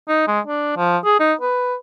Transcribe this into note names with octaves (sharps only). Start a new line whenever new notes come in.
D#4
G#3
D4
F3
G#4
D#4
B4